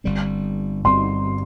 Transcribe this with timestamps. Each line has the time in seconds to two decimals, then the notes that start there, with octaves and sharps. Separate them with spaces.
0.04 G1 G2 G3 C4
0.84 G1 G2 G3 C4 C6